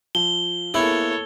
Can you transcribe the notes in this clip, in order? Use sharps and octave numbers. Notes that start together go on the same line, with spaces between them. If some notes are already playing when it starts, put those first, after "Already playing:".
F3 G7
A#3 B3 E4 G#4 A4 C#5